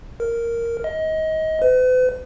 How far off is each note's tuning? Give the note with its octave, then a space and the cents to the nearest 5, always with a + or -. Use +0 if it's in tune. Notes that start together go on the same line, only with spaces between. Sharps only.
A#4 -5
D#5 +25
B4 +45